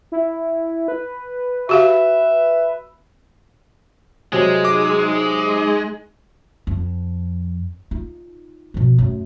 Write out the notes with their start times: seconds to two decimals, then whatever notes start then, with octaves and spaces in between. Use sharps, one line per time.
0.12 E4
0.88 B4
1.69 F#4 G4 E5 F5
4.33 C3 F#3 G#3
4.65 D#4 G#4 D6
6.67 F2
7.91 D#4 F4
8.74 B2 F3
8.98 F#2 A3